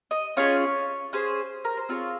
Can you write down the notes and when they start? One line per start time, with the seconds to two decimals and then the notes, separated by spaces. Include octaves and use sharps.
0.11 D#5
0.37 C#4 F4 G#4 C#5
1.13 C#4 G#4 C5
1.65 A#4
1.77 C5
1.89 C4 F4 G#4 C#5